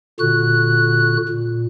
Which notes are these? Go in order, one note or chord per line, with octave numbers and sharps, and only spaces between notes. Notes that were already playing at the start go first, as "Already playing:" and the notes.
A#2 D3 F#4 F#6
A#2